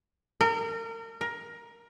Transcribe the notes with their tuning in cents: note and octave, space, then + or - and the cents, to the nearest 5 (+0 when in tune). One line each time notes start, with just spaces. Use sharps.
A#4 -30
A#4 +15